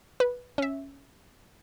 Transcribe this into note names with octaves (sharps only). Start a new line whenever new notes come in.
B4
C#4 E5